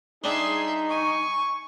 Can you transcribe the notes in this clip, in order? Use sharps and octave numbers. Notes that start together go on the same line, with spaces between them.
G3 D4 D#4 G#4 E5 C6
G#5 C#6